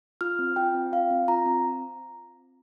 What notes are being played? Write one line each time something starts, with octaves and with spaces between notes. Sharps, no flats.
F4 F6
C4
F4 G5
C4
F4 F5
C4
F4 A#5
C4